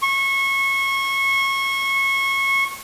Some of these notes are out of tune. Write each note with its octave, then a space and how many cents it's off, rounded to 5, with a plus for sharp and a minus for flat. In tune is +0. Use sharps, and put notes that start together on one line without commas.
C#6 -25